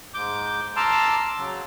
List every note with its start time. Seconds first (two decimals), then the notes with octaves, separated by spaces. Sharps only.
0.14 G#2 D6 G6
0.76 A5 A#5 C6 D6 E6 F6
1.37 C#3 F#3